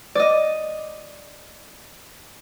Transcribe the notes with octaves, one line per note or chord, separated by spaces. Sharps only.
D5 D#5